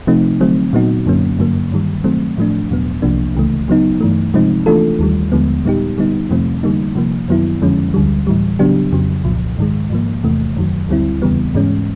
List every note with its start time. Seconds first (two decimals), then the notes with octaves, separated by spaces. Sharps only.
0.07 C3 F3 A3 C4 D#4
0.41 D3 F#3 A3 C4
0.73 A#2 F#3 B3 D#4 F#4
1.06 F#2 D3 F#3 A#3 C#4
1.39 G2 D3 F#3 A#3
1.71 G2 D#3 G3
2.04 D#3 F#3 A3 C4
2.38 A2 F3 A3 D4
2.70 E2 B2 F#3 B3
3.02 C2 C3 F3 A#3 D4
3.35 C#2 C#3 E3 A3
3.68 C#3 F#3 B3 D#4
4.01 G2 E3 A3
4.34 C3 F3 G#3 C4 D#4
4.66 E3 A3 D4 F4 A4
4.99 D#2 D#3 G3
5.32 D#2 D3 F3 G#3 B3
5.65 A#2 G3 B3 D#4 G4
5.98 D3 G3 B3 D#4
6.30 F2 C3 F3 A3 C4
6.63 D3 G3 A#3 D#4
6.96 C3 F3 A#3
7.29 F#2 D#3 F#3 B3 E4
7.62 F2 D3 F3 G#3 C#4
7.94 D2 D3 G3
8.27 A2 E3 G3
8.59 C#3 F#3 B3 D4 G4
8.93 F2 C#3 F#3
9.25 C2 A#2 F3
9.58 G#2 D#3 G#3
9.90 G#2 F3 A#3
10.24 E2 C3 E3 A3
10.56 F#2 D#3 F#3
10.89 D2 D3 G3 C4 E4
11.22 E2 C#3 E3 G3 B3
11.55 G#2 E3 G#3 C#4